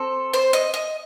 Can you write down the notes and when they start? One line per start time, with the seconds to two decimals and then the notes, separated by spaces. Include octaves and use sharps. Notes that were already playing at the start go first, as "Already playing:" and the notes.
Already playing: C4 A4
0.34 C5
0.53 D#5
0.74 D#5